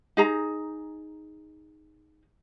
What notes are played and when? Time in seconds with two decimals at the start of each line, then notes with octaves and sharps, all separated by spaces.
0.17 D#4 G#4 A#5